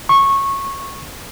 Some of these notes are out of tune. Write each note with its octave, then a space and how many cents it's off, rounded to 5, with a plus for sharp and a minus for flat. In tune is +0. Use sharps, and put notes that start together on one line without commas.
C#6 -15